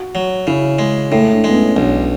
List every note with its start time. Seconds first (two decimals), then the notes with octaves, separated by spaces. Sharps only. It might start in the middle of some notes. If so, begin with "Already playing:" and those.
Already playing: F#4
0.15 F#3
0.47 C#3 E4
0.79 G#3
1.11 A2 E4
1.33 D4
1.44 G#3 B3
1.55 C#4
1.76 B1 D4